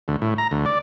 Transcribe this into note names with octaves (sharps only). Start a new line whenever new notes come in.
D2
A2
A#5
D2
D5